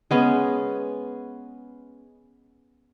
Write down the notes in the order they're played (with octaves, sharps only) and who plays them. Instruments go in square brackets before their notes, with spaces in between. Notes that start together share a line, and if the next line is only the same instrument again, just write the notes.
[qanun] G#3 B3 C#4